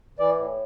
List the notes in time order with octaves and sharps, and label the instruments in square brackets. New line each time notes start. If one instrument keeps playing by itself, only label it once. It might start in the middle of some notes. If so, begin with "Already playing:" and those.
[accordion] E3 D5
A2